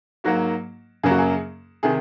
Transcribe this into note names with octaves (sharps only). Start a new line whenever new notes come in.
G#2 F#3 A#3 F#4
F#2 C#3 F#3 A#3 G#4
F#4
G#4
C3 D#3 G#4